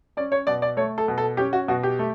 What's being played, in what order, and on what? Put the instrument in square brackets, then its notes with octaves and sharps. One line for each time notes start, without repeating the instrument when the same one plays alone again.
[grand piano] C#4 D5
C#5
B2 D5
D5
A3 C#5
A4
B2
A4
C#4 G4
F#4
B2 F#4
G4
A3